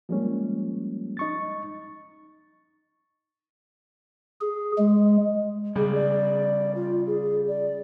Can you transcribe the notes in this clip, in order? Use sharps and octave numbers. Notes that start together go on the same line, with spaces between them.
F3 G3 G#3 A#3 C#4
D#4 C#6 A6
G#4
G#3
C#3 G3 G#4
D5
F4
G#4
D5